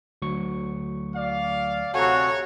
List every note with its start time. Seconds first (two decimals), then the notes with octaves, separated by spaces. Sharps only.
0.22 D2 F#3 C#6
1.16 D5 F5
1.94 C3 F#4 A4 C#5 G#5 A#5